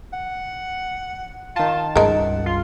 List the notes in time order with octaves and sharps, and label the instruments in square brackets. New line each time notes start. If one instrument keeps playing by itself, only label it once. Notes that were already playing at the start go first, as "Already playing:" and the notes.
[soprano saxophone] F#5
[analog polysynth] D#3 A5 [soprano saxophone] F4
[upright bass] C#2 G2 [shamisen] G#3 A#4 [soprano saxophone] F#5
[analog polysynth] F4 [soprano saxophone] C6